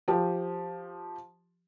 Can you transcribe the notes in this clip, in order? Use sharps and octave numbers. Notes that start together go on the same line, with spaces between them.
F3 G4